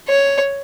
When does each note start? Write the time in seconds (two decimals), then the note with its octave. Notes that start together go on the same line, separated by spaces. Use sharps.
0.08 C#5